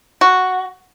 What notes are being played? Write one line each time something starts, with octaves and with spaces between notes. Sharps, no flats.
F#4